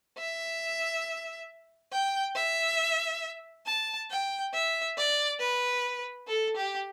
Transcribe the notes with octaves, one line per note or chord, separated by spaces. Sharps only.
E5
G5
E5
A5
G5
E5
D5
B4
A4
G4